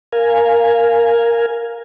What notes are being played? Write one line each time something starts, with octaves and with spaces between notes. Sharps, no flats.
A#4 F5 G#5